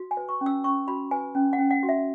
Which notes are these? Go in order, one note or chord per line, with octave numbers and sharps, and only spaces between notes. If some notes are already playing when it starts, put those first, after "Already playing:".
Already playing: F#4
G#5
B4
C#6
C#4
E6
C#4 C#6
F#4 B5
B4 G#5
C#4
F#5
C#4
F#5
F#4
E5